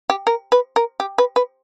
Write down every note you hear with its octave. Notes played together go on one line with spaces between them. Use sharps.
G4
A#4
B4
A#4
G4
B4
B4